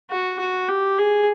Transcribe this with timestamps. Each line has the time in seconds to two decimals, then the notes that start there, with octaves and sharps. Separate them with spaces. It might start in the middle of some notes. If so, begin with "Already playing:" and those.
0.10 F#4
0.39 F#4
0.68 G4
0.98 G#4